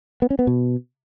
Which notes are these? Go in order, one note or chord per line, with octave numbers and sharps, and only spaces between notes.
B3
C#4
B3
B2